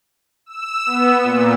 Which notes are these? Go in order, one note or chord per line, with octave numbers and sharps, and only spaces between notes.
E6
B3
A#2